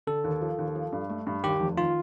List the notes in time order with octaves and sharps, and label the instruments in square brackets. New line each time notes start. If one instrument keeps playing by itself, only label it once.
[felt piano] D3 [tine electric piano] A4
[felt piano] D#2
F3
D#2
F3
G2
A3
G2
[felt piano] D#2 [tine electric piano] G4
[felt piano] F1
[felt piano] D#3 [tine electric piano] F4